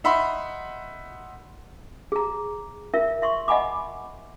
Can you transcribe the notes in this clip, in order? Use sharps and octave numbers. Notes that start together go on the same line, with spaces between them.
D#4 E5 F#5 B5 C6
G#4 A#5
F4 A#4 E5
E5 C6 C#6
D#5 F#5 G#5 B5 D6